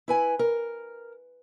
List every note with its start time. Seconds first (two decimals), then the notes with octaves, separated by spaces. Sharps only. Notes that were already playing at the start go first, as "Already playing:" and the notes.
0.08 E4 B4 G#5
0.39 A#4